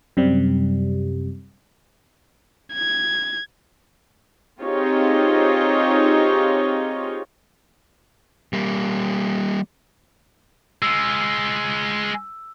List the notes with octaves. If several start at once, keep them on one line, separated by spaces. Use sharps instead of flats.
F#2 C3 G3
G#6
C4 D#4 F4 G4 G#4 C#5
G3 A#3
G#3 F4 E6